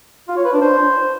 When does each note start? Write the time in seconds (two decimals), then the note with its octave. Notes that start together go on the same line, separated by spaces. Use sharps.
0.28 F4
0.37 C#5
0.45 B4
0.53 D4
0.62 C5